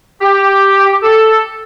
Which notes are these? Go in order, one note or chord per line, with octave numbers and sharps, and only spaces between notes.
G4
A4